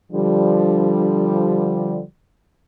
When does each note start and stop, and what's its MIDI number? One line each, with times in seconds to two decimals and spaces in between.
0.11 2.00 50
0.11 2.00 53
0.11 2.00 55